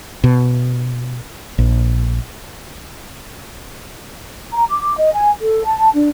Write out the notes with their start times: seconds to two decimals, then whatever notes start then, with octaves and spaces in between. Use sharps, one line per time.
0.24 B2
1.58 A#1
4.53 A#5
4.70 D6
4.97 D#5
5.14 G#5
5.41 A4
5.64 A5
5.94 D4